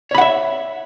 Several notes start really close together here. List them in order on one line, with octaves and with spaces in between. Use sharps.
C#5 B5 F#5 E5